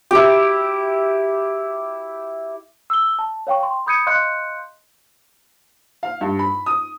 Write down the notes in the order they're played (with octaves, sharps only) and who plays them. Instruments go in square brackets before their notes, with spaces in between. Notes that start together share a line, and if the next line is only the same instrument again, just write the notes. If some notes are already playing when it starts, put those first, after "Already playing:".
[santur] E4 G4
[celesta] E6 G7
A5
C#5 F5 G5 C#6
G5 C6
B5 D#6 G6 G#6 C#7 D#7
D#5 F5 C6 F#6 G6 C#7
[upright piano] F5
G2
B5
D#6